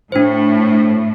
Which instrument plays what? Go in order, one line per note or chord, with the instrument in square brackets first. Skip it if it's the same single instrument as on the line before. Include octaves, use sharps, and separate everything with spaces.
[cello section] A2 [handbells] D4 C5